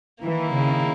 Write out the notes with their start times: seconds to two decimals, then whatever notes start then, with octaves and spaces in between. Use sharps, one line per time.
0.23 D#3 E3 A#3 E4
0.53 C#3